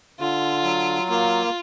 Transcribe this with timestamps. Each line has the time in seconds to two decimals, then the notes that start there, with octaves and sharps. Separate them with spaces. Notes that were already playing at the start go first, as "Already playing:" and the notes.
0.20 D3 F4
0.64 F#3
1.09 A#3 F4